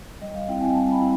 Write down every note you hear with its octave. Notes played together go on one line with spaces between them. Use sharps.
G3 D#5
F5
C4 E4 G5
G#5
G3 A5
B5
E4